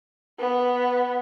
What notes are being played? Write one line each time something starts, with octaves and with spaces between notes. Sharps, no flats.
B3